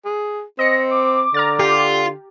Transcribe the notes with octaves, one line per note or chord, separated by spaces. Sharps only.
G#4
C4 D#5 A#6 C#7
D6
D3 A#5 F6 A6
F4 G4